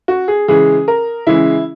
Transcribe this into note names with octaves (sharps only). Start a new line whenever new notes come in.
F#4
G#4
C#3 E3 G#3 G#4
A#4
C#3 E3 G#3 E4